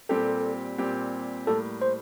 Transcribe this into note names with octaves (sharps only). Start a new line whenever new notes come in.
A#2 G3 C4 G4 A4
A#2 G3 C4 G4
A2 G3 A#3 A4
C5